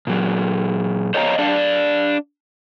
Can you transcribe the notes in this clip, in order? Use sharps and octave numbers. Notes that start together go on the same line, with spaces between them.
A#2 F#3
C5 C#5 D#5 F5 G#5 A#5
D4 D5 F5